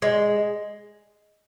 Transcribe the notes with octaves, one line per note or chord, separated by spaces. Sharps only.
G#3